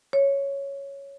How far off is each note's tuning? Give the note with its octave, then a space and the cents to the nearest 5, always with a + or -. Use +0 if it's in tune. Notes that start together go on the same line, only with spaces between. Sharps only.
C#5 +0